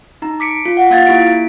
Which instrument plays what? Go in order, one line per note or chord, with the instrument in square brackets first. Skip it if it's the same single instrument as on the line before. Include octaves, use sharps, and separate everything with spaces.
[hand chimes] D#4 A#5
D6 B6 C#7 D7
F4
F#5
A#3 F4 F5 G#6 A6
A#3 E4 G4 B6 D7